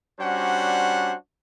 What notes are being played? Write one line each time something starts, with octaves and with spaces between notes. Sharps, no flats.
G3 C#4 D4 F#4 C5 F#5